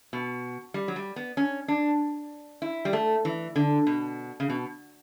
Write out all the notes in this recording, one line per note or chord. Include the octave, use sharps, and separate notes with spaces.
B2
G3
F#3
G3
B3
C#4
D4
E4
G3
A3
E3
D3
B2
C#3
B2